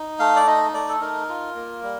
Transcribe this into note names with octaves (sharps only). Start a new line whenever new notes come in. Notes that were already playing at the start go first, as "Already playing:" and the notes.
Already playing: D#4
A3 F5
D5
D#4 D#5
A3 D5
A4
D#4 A#4
F4
A#3
G3